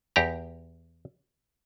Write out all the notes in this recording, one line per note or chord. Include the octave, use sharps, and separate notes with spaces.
E2 G4 A#5